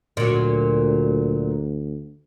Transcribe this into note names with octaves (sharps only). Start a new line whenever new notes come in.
D2 A#2 F#3